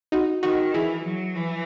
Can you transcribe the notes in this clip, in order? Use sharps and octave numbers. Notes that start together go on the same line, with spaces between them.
D#4 F#4
D#3 D#4 F#4
E3 E4 G#4
F#3
E3